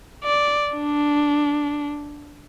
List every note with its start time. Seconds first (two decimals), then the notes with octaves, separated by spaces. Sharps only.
0.24 D5
0.75 D4